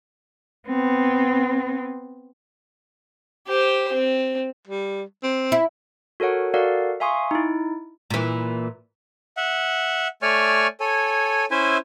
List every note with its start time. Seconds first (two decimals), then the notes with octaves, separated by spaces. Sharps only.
0.67 B3 C4
3.47 G4 C5
3.93 C4
4.67 G3
5.23 C4
5.52 E4
6.20 F#4 A4 A#4 C#5 F#5
6.54 F#4 A4 A#4 D5 F5 F#5
7.00 E5 F5 G#5 C6 C#6 D#6
7.31 D#4 E4
8.10 A#2 E3
9.37 E5 F#5
10.22 A3 C#5 D5 G#5 C#6 F6
10.80 A4 C#5 G#5
11.51 C#4 E4 C5 E5 G#5